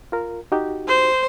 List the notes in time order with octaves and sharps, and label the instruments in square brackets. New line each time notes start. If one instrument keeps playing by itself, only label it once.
[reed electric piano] F4 A#4
D#4 F#4 G4
[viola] C5